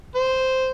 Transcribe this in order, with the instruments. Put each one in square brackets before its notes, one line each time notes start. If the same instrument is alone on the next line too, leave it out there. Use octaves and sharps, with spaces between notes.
[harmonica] C5